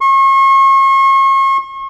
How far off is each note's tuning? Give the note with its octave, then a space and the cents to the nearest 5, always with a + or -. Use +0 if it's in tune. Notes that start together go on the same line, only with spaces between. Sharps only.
C#6 -40